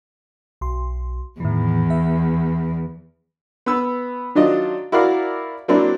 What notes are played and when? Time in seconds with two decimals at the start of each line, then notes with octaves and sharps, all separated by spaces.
0.61 B1 C6
1.40 E2 A2 D#3 E3
1.90 E5
3.66 B3 B4 E6
4.35 D#3 F#3 D4 F4 D#5
4.92 E4 F#4 A#4 D5 F5
5.68 F#3 A#3 C4 D4 E4